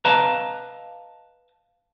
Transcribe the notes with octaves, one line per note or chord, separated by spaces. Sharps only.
B4 D#5 F5 A5 A#5